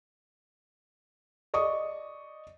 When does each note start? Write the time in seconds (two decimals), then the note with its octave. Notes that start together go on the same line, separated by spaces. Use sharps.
1.54 D5 D#5 C#6 D#6